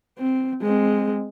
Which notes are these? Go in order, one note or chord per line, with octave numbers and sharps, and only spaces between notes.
C4
G#3 C4